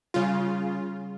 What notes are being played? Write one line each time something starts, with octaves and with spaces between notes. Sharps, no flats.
C#3 G3 F4